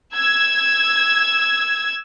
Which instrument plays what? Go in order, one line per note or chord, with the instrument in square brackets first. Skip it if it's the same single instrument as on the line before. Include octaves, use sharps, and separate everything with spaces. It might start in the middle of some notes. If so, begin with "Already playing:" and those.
[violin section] E6 G#6